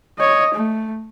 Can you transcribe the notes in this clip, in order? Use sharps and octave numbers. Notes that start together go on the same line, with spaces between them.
C#5 D#5
A3